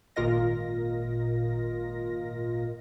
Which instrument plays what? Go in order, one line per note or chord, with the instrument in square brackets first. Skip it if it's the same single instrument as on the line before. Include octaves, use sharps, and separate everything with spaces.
[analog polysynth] G#1 A#2 F4 A#4 D#5 A#6